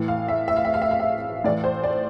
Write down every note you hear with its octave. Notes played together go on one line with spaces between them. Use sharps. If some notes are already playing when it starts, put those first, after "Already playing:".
Already playing: A2 E3
F5
E5
E5
F5
E5
F5
E5
F5
E5
A2 E3 D5
C5
D5